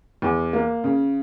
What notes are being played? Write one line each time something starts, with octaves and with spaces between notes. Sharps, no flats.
E2
A#3
C#3